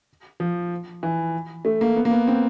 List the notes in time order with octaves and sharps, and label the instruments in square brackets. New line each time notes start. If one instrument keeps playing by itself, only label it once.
[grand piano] F3
E3
A3
A#3
B3
A#3
B3
C4